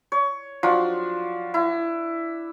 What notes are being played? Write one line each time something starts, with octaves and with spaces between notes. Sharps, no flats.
C#5
F3 F#3 D4 F4
E4